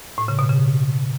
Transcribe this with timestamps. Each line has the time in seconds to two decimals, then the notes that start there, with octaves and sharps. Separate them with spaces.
0.18 A2
0.28 C#3
0.39 B2
0.49 C#3